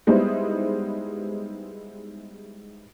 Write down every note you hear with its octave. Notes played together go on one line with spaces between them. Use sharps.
G3 G#3 B3 D#4 E4 C5